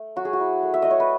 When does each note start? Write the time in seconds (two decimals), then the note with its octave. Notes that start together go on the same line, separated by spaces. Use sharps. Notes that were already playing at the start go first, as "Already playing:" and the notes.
Already playing: A3
0.16 F#3 F#4
0.25 G#4
0.33 F#4
0.40 E4
0.63 A3
0.74 E5
0.82 A3 D#5
0.90 C#5
1.00 B4